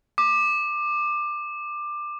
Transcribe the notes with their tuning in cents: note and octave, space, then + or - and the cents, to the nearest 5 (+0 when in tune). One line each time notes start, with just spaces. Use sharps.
D6 +20